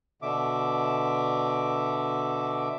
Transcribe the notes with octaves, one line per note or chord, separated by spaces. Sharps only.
B2 D3 E5 D6